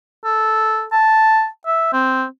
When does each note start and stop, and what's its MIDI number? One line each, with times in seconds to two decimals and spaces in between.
0.25 0.83 69
0.92 1.46 81
1.66 1.90 76
1.93 2.25 60